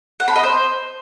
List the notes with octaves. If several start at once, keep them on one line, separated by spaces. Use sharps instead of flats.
F#5
B5
D#5
C5